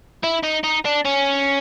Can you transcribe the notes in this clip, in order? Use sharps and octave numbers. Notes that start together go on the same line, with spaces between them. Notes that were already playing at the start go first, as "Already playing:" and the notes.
E4
D#4
D#4
D4
C#4